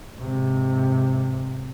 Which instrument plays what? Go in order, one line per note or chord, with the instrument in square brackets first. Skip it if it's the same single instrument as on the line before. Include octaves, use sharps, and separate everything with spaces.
[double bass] G#2 C3